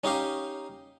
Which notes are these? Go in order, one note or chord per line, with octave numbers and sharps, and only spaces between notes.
C#4 D#4 G4 F5